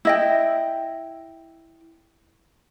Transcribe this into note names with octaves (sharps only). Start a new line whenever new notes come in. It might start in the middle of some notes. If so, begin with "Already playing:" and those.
E4 D#5 G5